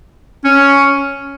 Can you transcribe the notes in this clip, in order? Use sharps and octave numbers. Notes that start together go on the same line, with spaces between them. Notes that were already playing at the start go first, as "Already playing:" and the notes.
C#4